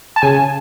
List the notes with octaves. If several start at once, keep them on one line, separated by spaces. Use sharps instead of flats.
A5
C#3 G#5
C#3